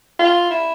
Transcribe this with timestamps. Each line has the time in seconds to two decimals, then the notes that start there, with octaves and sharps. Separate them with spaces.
0.19 F4
0.51 E4